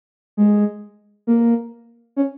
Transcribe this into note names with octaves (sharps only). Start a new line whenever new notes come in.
G#3
A#3
C#4